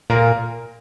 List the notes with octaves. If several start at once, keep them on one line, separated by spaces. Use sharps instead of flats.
A#2 A#4